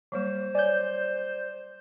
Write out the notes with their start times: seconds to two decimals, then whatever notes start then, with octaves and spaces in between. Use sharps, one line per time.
0.12 F#3 G3 A#3 C5
0.55 C#5 D5 G#5 G6